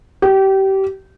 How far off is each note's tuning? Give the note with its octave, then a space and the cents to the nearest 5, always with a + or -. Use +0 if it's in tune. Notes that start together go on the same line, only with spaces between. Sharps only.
G4 -25